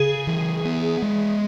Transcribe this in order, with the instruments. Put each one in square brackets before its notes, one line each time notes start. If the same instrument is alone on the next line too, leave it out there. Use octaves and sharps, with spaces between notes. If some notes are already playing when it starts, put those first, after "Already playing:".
Already playing: [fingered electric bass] C#3 [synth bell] G#4
[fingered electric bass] E3
B3
G#3